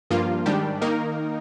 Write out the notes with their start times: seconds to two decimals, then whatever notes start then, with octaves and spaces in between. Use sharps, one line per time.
0.10 G2 F3 A#3 F4
0.46 G#2 D#3 G3 D4 G4
0.81 D#3 A#3 D#4 A#4